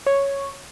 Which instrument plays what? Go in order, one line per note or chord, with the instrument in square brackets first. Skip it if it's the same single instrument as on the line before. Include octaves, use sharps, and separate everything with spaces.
[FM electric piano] C#5